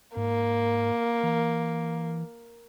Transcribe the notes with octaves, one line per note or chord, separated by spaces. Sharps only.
G#2 A#3
E3